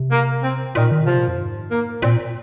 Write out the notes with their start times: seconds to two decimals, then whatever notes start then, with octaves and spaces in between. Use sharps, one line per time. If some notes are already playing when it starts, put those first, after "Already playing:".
Already playing: C3
0.12 A#3
0.43 C4
0.75 A#2 D#3
0.92 D#3
1.07 C3 F3
1.17 A#2
1.28 F2
1.39 G#2
1.71 A#3
2.02 A#2 C4